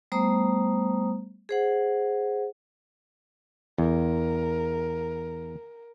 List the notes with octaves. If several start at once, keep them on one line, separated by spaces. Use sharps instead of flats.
G3 A3 B3 C5 A#5 D#6
G#4 C5 F#5
E2 A#4